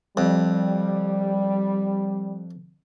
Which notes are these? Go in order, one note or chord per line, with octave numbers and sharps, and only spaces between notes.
F2 G3